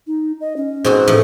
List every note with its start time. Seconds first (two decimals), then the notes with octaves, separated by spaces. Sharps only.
0.07 D#4
0.41 D#5
0.57 C#4
0.85 G#2 B2 C4 F#4
1.08 A2 F3